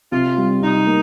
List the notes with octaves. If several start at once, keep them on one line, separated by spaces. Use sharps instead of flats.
C3 F4
G3
C3 D#4
A#3